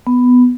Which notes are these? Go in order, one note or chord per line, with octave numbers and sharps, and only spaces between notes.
B3